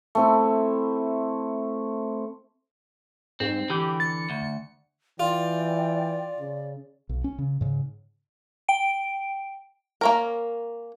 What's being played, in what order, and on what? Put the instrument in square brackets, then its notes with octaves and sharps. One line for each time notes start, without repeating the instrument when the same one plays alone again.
[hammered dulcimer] A3 C4 E4
[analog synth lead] G#2 [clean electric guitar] C4
[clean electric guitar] D3 E3 [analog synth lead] G4
[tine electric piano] A6 [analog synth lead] C#7
[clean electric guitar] D2
[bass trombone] E3 [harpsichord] F4 [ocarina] D5 [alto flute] G5
[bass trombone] C#3
[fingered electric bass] B1
C#4
C#3
G#2 C#3
[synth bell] G5 D7
[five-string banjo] A#3 C#4 A#4